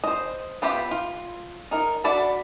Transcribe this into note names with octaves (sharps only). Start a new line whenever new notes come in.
C5 D#5
B3 F4 G4 E5 B5
F4
D#4 A#4
D4 F#4 D5 E5 B5